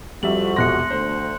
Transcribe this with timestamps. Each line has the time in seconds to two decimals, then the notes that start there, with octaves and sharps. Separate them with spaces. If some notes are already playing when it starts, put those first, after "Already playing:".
0.23 F2 G3 F#4 E5 F#7
0.56 E1 C3 C6 F#6 A#6 C#7
0.90 D2 C5